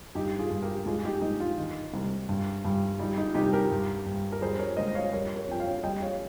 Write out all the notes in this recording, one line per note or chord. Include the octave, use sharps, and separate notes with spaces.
G2 D#4 G4
F4 G#4
G2
G4 A#4
G#2 F4 G#4
D#4 G4
G#2 D#4
F4
D#3
C2
G2
G2
G3 D#4
D#4
C2 D#4 G4
G4 A#4
G2
G2
A#4
G3 G#4 C5
A#4 C#5
C#2 C5 D#5
C#5 F5
G3 A#4 C#5
A#4 C#5
F2 G5
C#5 F5
G3 D#5 G5
C#5 F5